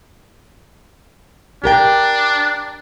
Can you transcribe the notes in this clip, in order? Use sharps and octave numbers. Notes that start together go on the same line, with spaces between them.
D4 G4 A#4 G5